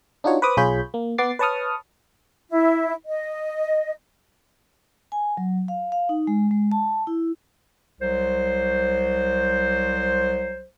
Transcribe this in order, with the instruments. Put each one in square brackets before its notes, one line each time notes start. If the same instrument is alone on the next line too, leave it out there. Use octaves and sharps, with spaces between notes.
[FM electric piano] D4 D#4 F4 F#4 C#5
B4 C5 B5 D6 D#6
B1 F4 G#4 C#5 B5 G6
A#3
B3 F#5 D6 A6 C7
B4 C#5 A5 C#6 D#6 F6
[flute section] E4
D#5
[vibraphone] G#5
F#3
F5
F5
D#4
G#3
G#3
A5
E4
[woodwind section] C2 F#3 C5